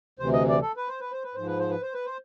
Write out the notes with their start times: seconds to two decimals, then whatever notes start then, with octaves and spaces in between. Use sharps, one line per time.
0.19 D2 C3 E3 C5
0.33 D#5
0.49 D5
0.62 A4
0.77 B4
0.88 C5
1.00 B4
1.12 C5
1.24 B4
1.35 G#2 F3 C5
1.47 B4
1.59 C5
1.70 B4
1.82 C5
1.94 B4
2.06 C5